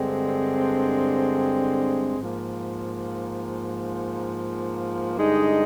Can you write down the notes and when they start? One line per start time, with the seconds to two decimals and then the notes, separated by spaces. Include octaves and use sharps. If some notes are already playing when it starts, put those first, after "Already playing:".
Already playing: G2 D3 G#3 C4
2.19 G#2 F3 A#3
5.16 G2 D3 G#3 D#4